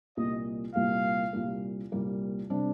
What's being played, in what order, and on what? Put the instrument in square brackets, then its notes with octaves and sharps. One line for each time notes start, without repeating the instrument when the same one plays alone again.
[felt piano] C2 A#2 G3 A#3 [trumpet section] D#5
[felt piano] C2 A#2 G3 A#3 [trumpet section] F5
[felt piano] C2 A#2 G3 A#3
C2 A#2 G3 A#3
C3 G3 D4